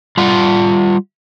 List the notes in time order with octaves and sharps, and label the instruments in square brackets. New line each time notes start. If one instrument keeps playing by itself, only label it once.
[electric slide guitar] G3 F4 F#5